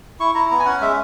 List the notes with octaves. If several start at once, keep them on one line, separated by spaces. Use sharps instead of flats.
E4 C#6
E4 A#5
B3 A#5
G#5
C#4 F#5
G#3 E5